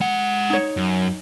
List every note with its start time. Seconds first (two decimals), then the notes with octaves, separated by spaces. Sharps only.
0.01 G#3 F#5
0.50 D#4 C#5
0.77 F#2